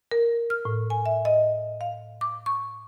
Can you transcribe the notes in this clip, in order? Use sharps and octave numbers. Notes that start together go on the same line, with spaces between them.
A#4
F6
A2
G#5
E5
D#5
F5
D6
C#6